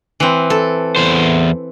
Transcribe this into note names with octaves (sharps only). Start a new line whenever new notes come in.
E3 C4
A4
E2 C5